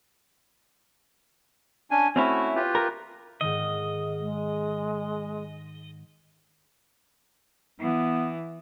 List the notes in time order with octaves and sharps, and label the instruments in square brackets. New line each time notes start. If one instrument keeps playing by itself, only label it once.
[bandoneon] C#4 D4 G#5
[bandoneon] A3 F#4 [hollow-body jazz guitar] C4 C#4 E4
[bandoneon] F4 G4 B4
[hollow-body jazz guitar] A#4
[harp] G#2 D#3 [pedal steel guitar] D#5
[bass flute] G#3
[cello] E3 [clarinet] B3